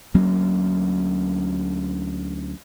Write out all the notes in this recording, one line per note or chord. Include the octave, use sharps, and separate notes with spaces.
D2 F#3 A#3 C#4